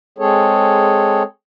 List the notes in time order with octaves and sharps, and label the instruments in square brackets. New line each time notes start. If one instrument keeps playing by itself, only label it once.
[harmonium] G#3 C4 G#4 A4 C#5